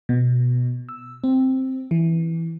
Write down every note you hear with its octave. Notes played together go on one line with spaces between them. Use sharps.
B2
E6
C4
E3